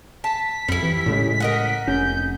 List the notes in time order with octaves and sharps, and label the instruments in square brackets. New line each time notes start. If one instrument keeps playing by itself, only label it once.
[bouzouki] A5 [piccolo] B6
[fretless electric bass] F2 [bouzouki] G3 E4
[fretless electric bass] E3
A2 C#3 G#3
[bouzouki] A#4 D#5 F#5
[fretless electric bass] F1 C#4 [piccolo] G6